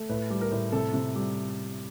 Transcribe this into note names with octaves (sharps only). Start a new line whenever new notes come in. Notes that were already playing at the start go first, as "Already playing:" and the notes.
Already playing: A3
A2 B4
G3
A#4
A2
C3 A4
C3
G3